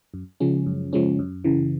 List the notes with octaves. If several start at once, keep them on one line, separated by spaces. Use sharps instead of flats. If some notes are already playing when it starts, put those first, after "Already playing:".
F#2
C#3 F3 G#3 C#4
F#2
C#3 F3 G#3 C#4
F#2
C#3 E3